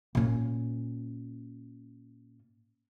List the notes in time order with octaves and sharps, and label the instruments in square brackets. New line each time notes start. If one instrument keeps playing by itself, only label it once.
[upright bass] A#2 C#4